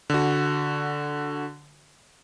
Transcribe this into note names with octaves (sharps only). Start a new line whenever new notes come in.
D3 F#4